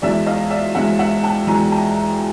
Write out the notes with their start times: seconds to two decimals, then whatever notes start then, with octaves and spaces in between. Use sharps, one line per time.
0.02 E2 B2 G#3 D5 E5
0.26 D#5 F5
0.50 D5 E5
0.75 E2 B2 G#3 E5 F#5
0.99 E5 F#5
1.23 G5 A5
1.47 E2 B2 G#3 G#5 A#5
1.71 G5 A5